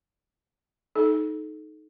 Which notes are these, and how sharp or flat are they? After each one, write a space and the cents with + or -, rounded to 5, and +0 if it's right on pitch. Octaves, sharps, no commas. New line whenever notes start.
D#4 +0 A4 -30